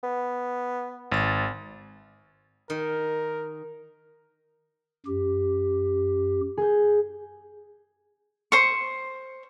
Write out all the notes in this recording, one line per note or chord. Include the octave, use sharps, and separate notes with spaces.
B3
G#1 A6
D#3 A#4
F#2 G4
G#4 G6
C5 C#6